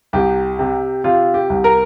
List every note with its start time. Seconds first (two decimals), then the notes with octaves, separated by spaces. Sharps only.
0.13 C2 G4
0.59 C3
1.04 C3 F4
1.34 G4
1.50 C2
1.64 A#4